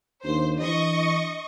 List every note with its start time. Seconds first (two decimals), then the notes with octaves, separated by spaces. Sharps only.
0.24 D#2 D4 C5
0.61 E3 D#5 C#6